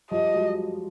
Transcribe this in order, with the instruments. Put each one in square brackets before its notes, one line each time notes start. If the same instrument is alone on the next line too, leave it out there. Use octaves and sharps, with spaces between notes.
[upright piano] F3 G3 [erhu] D#5
[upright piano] F#3 G#3